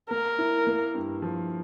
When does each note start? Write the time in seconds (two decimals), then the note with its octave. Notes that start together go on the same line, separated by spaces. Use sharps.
0.10 A#3 A#4
0.39 E4
0.67 A#3
0.94 G2
1.22 F3